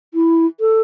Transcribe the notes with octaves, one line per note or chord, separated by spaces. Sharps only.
E4
A4